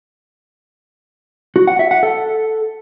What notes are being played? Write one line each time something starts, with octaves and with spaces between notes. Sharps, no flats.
F#4
F#5
E5
F#5
A4